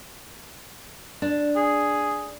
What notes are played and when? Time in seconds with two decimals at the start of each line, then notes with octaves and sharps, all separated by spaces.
1.22 D4
1.56 G#4